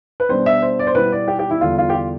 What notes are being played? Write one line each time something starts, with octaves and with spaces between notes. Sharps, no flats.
B4
B2 G3 D4 C5
E5
C5
D5
C5
B2 G3 B3 E4 B4
D5
G4
G4
E4
E2 D3 G3 F4
F4
G4
F4